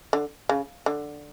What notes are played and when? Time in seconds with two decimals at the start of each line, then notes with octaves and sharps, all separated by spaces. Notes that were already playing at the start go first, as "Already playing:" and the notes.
0.13 D3
0.49 C#3
0.86 D3